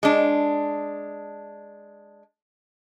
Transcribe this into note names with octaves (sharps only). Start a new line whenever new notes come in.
G#3 D4